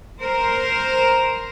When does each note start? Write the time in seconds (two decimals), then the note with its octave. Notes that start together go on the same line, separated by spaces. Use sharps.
0.20 A#4 C5